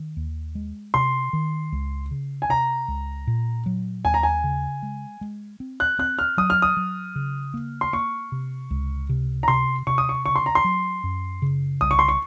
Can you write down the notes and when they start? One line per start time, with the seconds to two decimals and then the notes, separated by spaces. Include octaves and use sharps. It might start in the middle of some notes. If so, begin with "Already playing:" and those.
Already playing: D#3
0.17 D#2
0.55 G#3
0.94 C3 C6
1.33 D#3
1.72 C#2
2.11 C#3
2.42 G#5
2.49 C3 A#5
2.88 C#2
3.27 A#2
3.66 F#3
4.05 D#2 G#5
4.14 A#5
4.23 G#5
4.44 C#3
4.83 G#3
5.21 G#3
5.60 C4
5.80 F#6
5.99 C4 F#6
6.19 F6
6.38 F#3 D#6
6.50 F6
6.62 D#6
6.77 F#3
7.16 C#3
7.54 A#3
7.81 C6
7.93 A#3 C#6
8.32 C3
8.71 C#2
9.09 C3
9.43 A#5
9.48 C3 C6
9.87 C3 C#6
9.98 D#6
10.09 C#6
10.26 C#3 C#6
10.36 C6
10.46 A#5
10.55 C6
10.64 F#3
11.04 F#2
11.42 C#3
11.81 C2 D#6
11.91 C#6
11.99 C6
12.08 C#6